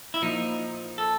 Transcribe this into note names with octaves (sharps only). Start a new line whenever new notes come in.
E4
A#2 F3 D#4
A4